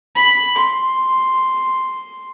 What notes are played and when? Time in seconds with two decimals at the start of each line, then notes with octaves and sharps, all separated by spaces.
0.15 B5
0.56 C6